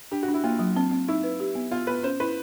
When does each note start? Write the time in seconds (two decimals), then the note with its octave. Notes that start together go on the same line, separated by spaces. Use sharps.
0.11 D4 G4
0.23 F#4
0.28 D4
0.34 E4
0.44 A#3 F4
0.59 F#3
0.76 C4
0.91 C4
1.08 D#4 E4
1.23 B4
1.40 G4
1.55 B3
1.71 B3 F4
1.87 B3 B4
2.03 C#4 C5
2.20 E4 B4